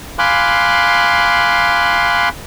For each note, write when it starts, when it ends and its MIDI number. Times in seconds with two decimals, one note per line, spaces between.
0.19 2.29 77
0.19 2.29 80
0.19 2.29 83
0.19 2.29 84
0.19 2.29 86
0.19 2.29 90